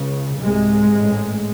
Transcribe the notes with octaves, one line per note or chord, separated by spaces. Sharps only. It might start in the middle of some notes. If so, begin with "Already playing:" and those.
Already playing: C#2 C#3
C2 G#2 C3 G#3
A1 A2